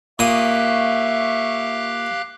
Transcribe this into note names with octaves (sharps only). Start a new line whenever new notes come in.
A#2 G4 E5 F5 C#6 D#6 F#6